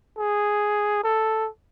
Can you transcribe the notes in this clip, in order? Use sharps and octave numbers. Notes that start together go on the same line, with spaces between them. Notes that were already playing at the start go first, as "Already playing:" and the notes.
G#4
A4